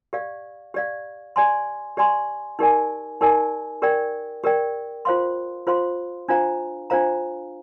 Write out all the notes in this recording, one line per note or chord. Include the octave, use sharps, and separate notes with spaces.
G4 D5 F5
G4 D5 F5
G4 D5 G#5 C6
G4 D5 G#5 C6
D#4 G4 A#4 D5 G#5
D#4 G4 A#4 D5 G#5
G4 A#4 D5 G5
G4 A#4 D5 G5
F4 C5 F5 C6
F4 C5 F5 C6
D4 F4 C5 F5 A#5
D4 F4 C5 F5 A#5